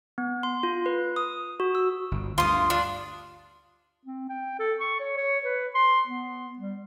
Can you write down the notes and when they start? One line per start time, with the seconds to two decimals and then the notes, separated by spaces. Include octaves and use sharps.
0.18 B3
0.43 C6
0.63 F4
0.86 B4
1.16 D#6
1.60 F#4
1.75 E6
2.11 G1
2.38 D2 G2 F4 C6 D#6
2.70 D4 F4
4.06 C4
4.29 G5
4.59 A4
4.80 C#6
5.00 C#5
5.17 C#5
5.44 B4
5.75 C6
6.07 B3
6.59 G3